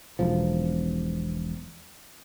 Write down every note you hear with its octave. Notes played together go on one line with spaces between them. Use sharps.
E1 B1 F3